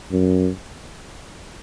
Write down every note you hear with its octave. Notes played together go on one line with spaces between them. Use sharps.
F#2